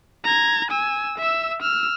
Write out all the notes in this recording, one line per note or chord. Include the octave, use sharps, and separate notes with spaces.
A#5 G#6
G#5 E6
E5 E6
E6 F6